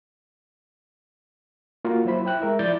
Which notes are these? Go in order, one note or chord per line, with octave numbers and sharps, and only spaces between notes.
A#3 F4 F#4
F#3 E4 C5 B5
E4 G5 F#6
G#3 A#4 E5
F3 E4 D5 G6 A6